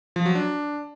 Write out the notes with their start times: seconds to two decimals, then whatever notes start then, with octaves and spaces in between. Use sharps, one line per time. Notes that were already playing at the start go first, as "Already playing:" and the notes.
0.16 F3
0.26 F#3
0.35 D4